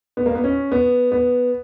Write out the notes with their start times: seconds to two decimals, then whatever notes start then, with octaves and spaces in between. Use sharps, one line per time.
0.17 B3
0.26 A#3
0.35 B3
0.44 C#4
0.72 B3
1.12 B3